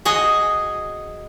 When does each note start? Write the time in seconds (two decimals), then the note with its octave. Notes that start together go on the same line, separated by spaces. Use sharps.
0.05 F#4 G#4 C#5 D#5